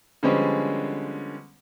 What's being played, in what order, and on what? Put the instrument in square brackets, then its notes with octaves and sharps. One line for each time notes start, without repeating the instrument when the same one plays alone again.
[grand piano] D3 F3 G3 G#3 B3 C#4